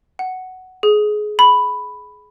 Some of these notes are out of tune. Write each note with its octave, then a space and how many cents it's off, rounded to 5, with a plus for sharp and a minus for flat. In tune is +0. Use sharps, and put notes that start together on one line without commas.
F#5 +5
G#4 +20
B5 +5